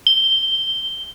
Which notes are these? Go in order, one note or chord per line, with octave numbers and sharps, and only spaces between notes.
G7